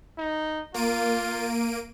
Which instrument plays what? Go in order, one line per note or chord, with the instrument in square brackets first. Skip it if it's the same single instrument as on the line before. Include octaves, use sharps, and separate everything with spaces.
[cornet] D#4
[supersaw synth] A#3 D7 D#7 [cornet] F4